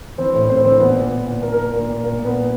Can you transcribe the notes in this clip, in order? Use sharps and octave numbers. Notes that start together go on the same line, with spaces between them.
E3 C4 C5
A2
A2 C4 C5
E3 C4 C5
A#2 B3 B4
A#2
A#2
A#2
A#2 A#4
A#4
A#2
A#4
A#2
A#2
A#2 A#4
A#2
B3 B4
A#2